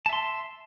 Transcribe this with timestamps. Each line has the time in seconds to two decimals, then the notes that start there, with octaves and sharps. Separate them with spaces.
0.06 A5
0.09 E5
0.13 C6